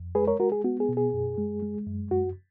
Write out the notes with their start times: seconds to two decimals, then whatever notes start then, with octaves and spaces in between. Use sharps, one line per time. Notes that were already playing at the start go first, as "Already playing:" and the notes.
Already playing: F2
0.15 G#3 G#4 B4
0.27 A#4 C#5
0.40 G#3 F#4 A#4
0.52 G#4
0.64 B3 F#4
0.80 G#4
0.89 B2
0.97 G#4
1.13 F#2
1.38 G#3
1.63 G#3
1.87 F#2
2.11 F#2 F#4